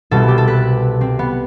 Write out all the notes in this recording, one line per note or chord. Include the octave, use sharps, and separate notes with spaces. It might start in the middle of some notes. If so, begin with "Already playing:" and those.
C2 B2 A4
G4
A4
B4
C4
B3